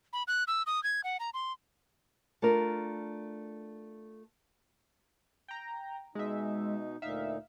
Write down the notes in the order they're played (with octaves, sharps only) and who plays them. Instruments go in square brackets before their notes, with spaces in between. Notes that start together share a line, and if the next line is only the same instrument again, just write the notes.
[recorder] B5
F#6
E6
D#6
G#6
F#5
A#5
C6
[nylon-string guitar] A3 D4 F4 A#4
[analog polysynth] G5 A#5
[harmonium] B2 D#4 [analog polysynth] G#3 E5
[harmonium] D2 A#2 D#4 [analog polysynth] E5 F5